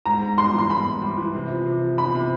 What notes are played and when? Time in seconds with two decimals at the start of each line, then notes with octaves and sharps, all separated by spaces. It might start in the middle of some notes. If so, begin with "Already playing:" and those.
0.06 G#2 A#5
0.22 G#2
0.38 G3 C6
0.54 E3 C6
0.70 G#2 B5
0.87 G#2
1.02 G3
1.18 E3
1.35 C3
1.50 F3
1.66 C3
1.82 F3
1.98 F3 B5
2.15 C3